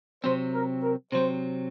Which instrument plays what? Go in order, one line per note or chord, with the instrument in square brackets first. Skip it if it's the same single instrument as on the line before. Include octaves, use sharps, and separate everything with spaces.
[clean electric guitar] C3 F#3 C4 [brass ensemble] C5
[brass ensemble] A#4
A#4
[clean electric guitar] C3 F#3 C4 [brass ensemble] C5